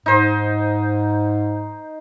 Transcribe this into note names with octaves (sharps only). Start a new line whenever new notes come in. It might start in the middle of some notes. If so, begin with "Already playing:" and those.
G#2 D#4 C5